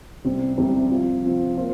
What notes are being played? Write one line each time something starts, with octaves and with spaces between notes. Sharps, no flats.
C2 C3 G3 C4
C2 C3 G3 C4
F3 C4 F4
F3 C4 F4
A#3 F4 C5